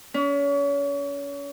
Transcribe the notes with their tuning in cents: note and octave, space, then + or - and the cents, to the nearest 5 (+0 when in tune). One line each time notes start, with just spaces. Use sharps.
C#4 +35